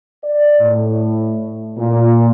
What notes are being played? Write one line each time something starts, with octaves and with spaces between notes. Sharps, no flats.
D5
A2
A#2